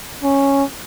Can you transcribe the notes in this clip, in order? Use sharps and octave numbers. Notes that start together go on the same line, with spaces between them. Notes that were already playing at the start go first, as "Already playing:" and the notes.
C#4